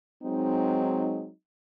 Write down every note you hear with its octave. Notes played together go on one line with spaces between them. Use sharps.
F#3 G#3 C4 D#4